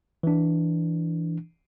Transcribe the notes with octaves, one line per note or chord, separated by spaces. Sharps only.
E3 D4